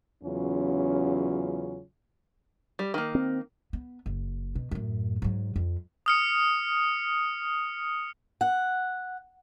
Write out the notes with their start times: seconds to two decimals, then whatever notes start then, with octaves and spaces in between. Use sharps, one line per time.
0.24 E2 C#3 F#3 C#4 F4
2.79 G3
2.94 D#3 A#3
3.15 C4
3.73 B3
4.06 F#1
4.55 B2
4.71 F#2 A2
5.22 G#2 F#3
5.56 F2
6.06 D#6 F6 C#7
8.41 F#5